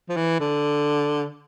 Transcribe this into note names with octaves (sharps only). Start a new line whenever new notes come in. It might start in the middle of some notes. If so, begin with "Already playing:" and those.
F3
E3
D3